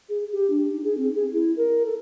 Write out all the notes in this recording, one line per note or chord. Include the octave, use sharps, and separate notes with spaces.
G#4
G4
D4
D#4
G#4
C4
G#4
E4
A#4
A4